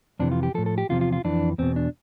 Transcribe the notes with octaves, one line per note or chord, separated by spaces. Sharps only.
F2 C3 E3 D4
F4
G4
A2 F3 A4
A4
G4
E2 C3 F3 F4
F4
F4
F2 E3 D4
E2 B2 C4
D4